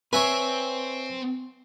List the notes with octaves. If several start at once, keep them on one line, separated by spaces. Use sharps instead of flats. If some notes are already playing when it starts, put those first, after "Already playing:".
C4 B4 C#5 E5 G#5